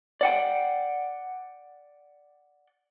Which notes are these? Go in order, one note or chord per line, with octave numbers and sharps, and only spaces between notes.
D5 F#5 G5